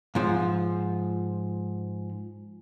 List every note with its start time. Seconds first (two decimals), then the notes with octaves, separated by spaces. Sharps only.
0.15 G#2 F3